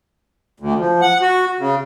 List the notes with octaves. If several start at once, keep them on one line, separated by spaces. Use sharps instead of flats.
D2
F3
F#5
F#4
C#3